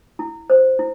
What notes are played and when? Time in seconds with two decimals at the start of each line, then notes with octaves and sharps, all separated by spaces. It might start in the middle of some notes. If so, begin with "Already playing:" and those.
0.19 E4
0.50 C5
0.79 E4